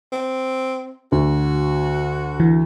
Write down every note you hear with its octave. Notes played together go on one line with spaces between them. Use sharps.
C4
D2 F#4
E3